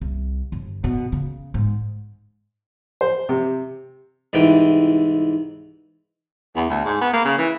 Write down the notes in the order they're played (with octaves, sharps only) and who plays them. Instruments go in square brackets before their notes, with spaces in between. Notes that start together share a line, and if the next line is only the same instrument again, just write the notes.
[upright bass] C2
G1
B2
C#3
G#2
[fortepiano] C5
C3
[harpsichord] C2 G#2 E3 G5
[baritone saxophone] E2
D2
G#2
B3
A#3
C#3
E3